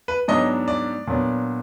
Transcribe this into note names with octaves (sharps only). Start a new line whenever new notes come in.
B4
G#2 F#3 B3 D4 D#5
D5
A#2 F#3 B3 D4